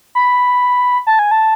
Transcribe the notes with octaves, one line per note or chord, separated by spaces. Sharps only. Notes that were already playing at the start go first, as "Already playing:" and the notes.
B5
A5
G#5
A5